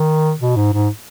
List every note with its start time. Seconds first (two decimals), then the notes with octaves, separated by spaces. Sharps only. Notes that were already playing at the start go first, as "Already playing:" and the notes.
Already playing: D#3
0.40 B2
0.57 G#2
0.74 G#2